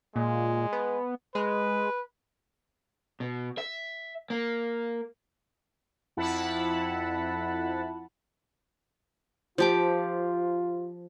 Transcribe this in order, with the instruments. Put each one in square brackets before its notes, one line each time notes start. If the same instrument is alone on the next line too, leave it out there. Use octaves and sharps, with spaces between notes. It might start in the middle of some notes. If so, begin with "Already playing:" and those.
[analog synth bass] A#2 [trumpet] G#3
[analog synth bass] B3
[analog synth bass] G#3 [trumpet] B4
[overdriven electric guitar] B2
E5
A#3
[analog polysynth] F2 E4 F#5 A5 B5
[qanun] F3 G4 D6 [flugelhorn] F4 [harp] C5 A5